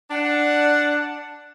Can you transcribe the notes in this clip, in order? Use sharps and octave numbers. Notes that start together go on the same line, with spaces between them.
D4 F#5